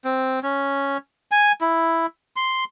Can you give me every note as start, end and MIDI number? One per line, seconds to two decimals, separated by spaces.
0.05 0.39 60
0.43 0.97 61
1.31 1.52 80
1.61 2.06 64
2.36 2.64 84